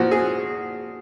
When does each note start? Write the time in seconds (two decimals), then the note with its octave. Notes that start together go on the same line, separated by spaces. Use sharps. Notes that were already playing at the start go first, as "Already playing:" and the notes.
Already playing: A#2 F3 F#4
0.11 G#4